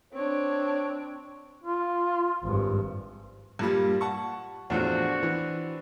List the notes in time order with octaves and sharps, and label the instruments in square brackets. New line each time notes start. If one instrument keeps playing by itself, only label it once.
[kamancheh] C4 D4 [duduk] C#5
[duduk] F4
[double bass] G#1 G2
[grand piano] G2 A#2 G3
F#5 A5 C#6
[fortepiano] E2 A2 F3 [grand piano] C4 D4 [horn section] F#4
[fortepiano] E3